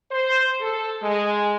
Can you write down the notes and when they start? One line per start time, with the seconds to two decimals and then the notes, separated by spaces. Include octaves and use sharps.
0.11 C5
0.60 A4
1.03 G#3